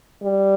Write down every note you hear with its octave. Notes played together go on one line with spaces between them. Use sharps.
G3